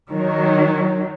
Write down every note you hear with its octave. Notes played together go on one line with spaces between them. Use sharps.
D#3 F#3